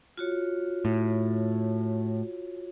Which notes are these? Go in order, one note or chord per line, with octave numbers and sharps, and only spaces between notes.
F4 F#4 C#5
A2